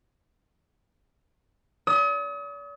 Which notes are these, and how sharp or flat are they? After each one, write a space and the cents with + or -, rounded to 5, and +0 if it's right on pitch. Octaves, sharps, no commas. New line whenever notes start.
D5 -40 D#6 +40